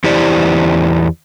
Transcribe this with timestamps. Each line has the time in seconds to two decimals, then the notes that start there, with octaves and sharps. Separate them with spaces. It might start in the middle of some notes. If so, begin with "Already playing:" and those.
0.04 E2 E4 G4 C5 D5